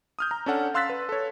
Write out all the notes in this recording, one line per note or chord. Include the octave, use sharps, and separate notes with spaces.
D#6 F6 G6
A#5
C#4 D4 A4 F#5
F5 C6 E6 F#6 A6 B6
B4
A4 C#5